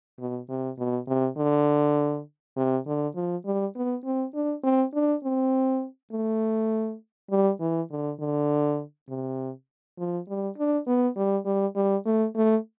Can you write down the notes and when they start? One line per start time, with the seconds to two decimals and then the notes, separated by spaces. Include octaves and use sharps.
0.19 B2
0.49 C3
0.78 B2
1.08 C3
1.37 D3
2.57 C3
2.86 D3
3.15 F3
3.45 G3
3.76 B3
4.05 C4
4.34 D4
4.63 C4
4.94 D4
5.24 C4
6.12 A3
7.30 G3
7.60 E3
7.91 D3
8.20 D3
9.09 C3
9.98 F3
10.28 G3
10.58 D4
10.87 B3
11.17 G3
11.46 G3
11.76 G3
12.06 A3
12.35 A3